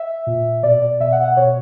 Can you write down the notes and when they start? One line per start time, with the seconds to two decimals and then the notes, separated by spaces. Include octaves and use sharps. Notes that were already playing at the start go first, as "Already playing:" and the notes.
Already playing: E5
0.27 A#2
0.63 B2 D5
0.82 D5
1.00 B2 E5
1.12 F#5
1.24 F#5
1.37 B2 C#5